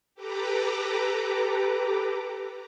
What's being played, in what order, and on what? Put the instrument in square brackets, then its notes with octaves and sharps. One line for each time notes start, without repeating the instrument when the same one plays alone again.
[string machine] G4 A4 B4 A#5 D6